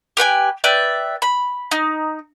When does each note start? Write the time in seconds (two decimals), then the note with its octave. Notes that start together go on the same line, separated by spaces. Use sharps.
0.17 G4 B4 G5 G#5
0.64 B4 D5 E5 G5
1.22 B5
1.71 D#4